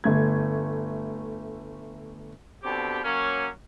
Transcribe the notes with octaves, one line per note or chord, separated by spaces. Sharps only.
G1 A3 G#6
B2 D3 C4 G4
F#3 A#3 C#4